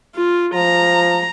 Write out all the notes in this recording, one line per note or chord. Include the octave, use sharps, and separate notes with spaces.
F4
F3 A#5